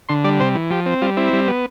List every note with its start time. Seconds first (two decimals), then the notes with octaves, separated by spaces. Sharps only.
0.09 D3 C6
0.24 G3 D5
0.40 C3 C5
0.55 E3
0.70 F3 G4
0.86 C4
1.02 G3 F4
1.17 C4 E4
1.33 G3
1.48 B3